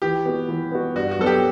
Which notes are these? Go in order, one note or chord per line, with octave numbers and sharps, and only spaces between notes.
E3 G4
B3 F#4
E3
B3 F#4
G2 F#4
F#4
F#3 B3 A4
G4